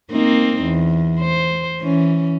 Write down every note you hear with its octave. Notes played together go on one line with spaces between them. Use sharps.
A#3 C4 D#4
E2
C5
E3 C#4